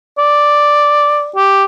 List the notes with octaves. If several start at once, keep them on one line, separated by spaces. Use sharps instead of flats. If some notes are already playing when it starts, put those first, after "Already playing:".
D5
G4